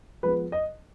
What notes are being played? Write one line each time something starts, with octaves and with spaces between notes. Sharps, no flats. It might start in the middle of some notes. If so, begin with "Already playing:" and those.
F3 G#3 B3 B4
D#5